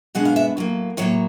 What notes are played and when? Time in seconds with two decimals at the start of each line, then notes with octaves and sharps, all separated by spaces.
0.15 B2 G#3 B3 D4 F#5
0.25 F5
0.36 E5
0.57 A2 F#3 A#3
0.97 A2 F#3 A#3 C#5